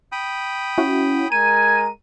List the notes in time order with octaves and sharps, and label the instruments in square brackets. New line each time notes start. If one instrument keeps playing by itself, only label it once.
[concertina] G5 B5 D#6
[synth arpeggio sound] C#4 E4 F#4
[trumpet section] G#3 A#4 A#5 [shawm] G#5 [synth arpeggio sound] D#7